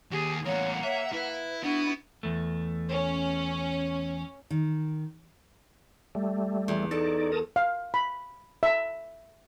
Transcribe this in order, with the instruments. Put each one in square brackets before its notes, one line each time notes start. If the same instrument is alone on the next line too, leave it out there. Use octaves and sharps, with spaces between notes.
[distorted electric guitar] D#2 [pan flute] G4 [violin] G#4
[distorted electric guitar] E2 A2 [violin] A#3 F#5 [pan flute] C#5
[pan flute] C#5 [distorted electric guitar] E5
[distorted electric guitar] E4 [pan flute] B4
[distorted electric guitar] B3 [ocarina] D4 [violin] E4 F#4
[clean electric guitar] E2 A3
[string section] C#4
[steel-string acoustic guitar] D#3
[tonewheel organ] G3 A3
[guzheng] E2
[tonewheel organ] D#4 D5 [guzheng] A4
[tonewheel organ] A#4 A5 D#6
[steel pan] F5
B5
E5